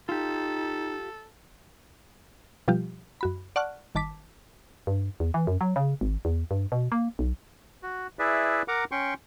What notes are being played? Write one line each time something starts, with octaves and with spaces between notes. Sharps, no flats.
D#4 F4 G4 A4
B2 F3 G3 F4 G4
F#2 F#4 B5
D5 F#5 A5 C#6 F6 F#6
G1 D#3 A5 D6 B6
G2
E2
E3
F#2
F#3
C#3
G#1
E2
G2
B2
A#3
B1
F#4
E4 G#4 B4 D5 E5
A#4 F#5 A#5 D6
C#4 G5 C6 C#6